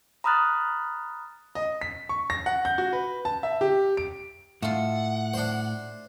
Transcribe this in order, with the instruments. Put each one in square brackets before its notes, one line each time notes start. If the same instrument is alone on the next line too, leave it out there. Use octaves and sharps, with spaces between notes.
[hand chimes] A#5 B5 D#6 F6 F#6 A6
[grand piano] D#5
B6
C#6
A#6
F#5
G6
F#4
B4
A5
E5
G4
D7
[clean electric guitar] A2 [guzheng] A3 F4 [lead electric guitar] F#5
[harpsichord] D4 C5